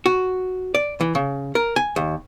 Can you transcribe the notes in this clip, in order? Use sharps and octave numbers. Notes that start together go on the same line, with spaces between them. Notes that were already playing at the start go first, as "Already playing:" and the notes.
F#4
D5
E3
C#3
A#4
G#5
D#2